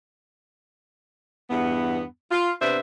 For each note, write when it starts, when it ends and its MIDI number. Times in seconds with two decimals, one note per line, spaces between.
1.50 2.03 40
1.50 2.03 43
1.50 2.03 59
2.31 2.52 65
2.62 2.80 48
2.62 2.80 59
2.62 2.80 62
2.62 2.80 72
2.62 2.80 76